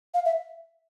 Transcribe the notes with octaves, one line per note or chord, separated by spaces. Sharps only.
F5
E5